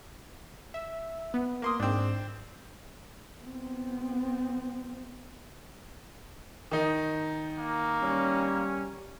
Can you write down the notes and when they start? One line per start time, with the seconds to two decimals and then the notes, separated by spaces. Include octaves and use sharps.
0.74 E5
1.34 B3
1.62 A#3 C6 D#6
1.80 G#2 C4 D4
3.41 B3 C4
6.71 D#3 D#4
7.59 A#3
8.03 G3 C#4